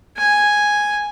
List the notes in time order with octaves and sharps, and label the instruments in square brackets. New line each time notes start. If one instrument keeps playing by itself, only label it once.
[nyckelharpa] G#5